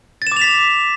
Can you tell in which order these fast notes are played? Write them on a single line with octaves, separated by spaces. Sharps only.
A6 E7 D6 F7 B6